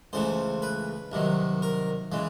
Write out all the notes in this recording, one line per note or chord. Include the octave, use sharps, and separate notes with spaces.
C#2 C#3 E3 A3 C5
B4
C2 C3 D#3 F#3
A#4
C#3 E3 G#3